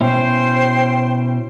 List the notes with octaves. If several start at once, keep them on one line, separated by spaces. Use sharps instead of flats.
B2 C#4 E4 C5 G5 C6